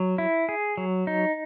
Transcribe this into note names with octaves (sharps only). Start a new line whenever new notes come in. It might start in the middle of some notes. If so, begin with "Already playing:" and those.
Already playing: F#3
E4
G#4
F#3
D#4